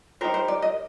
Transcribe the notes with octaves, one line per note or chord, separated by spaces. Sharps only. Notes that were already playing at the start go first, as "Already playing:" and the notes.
D#4 G4 A#4 C5
C5
D5
D#5